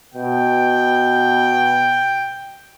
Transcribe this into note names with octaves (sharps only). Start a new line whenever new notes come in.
B2 G5